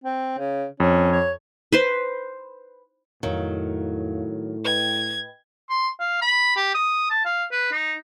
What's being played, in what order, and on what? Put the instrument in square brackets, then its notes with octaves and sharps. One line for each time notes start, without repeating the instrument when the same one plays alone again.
[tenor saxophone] C4
C#3
[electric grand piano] F2 [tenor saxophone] C#4
[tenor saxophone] C#5
[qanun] B4 C5 C6
[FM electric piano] F2 F5 [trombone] A2 [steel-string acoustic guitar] D#3 F#3
[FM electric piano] B4 D#5 G5 [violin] G#6
[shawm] C6
F5
B5
G4
D#6
A5
F5
B4
D#4